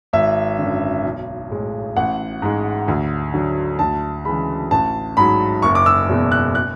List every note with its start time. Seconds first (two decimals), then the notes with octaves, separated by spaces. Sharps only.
0.13 G#1 E5
0.58 F#2 D3
1.05 B1
1.50 A2 G#3
1.97 A1 F#5
2.42 G#2 G#3
2.88 D2
3.34 D3 F#3
3.79 D2 A5
4.25 C#3 E3 G#3 B5
4.71 A1 A5
5.17 G#2 F#3 B5
5.62 F#1 C#6
5.75 D6
5.86 E6
6.09 E2 B2 G#3
6.32 F#6
6.55 F#6